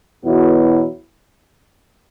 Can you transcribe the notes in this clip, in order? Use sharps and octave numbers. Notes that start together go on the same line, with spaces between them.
E2 B2 F#3 B3 E4